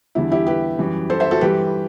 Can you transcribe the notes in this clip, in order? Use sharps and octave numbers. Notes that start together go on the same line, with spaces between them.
E2 D3 G3 E4
E4 G4
G4 B4
F#2 E3 G3
A4 C5
C5 E5
F#4 A4
G2 E3 G3 G4 B4